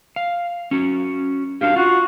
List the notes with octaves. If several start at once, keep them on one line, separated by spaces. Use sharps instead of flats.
F5
C#4 F#4
D4 F#4 G4 F5
F4 F#4